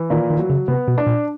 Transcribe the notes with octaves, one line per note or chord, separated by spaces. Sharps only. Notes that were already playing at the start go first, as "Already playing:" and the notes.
Already playing: E3
A#2 D#3
D#3
F#3
C#3
C3 B3
B2
D4
A#2